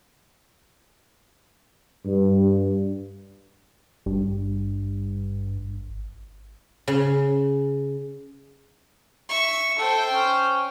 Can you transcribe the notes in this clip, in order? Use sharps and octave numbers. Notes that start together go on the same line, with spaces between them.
G2
G#1 G2
C#3
E5 C#6
A4 C5 G5
C#4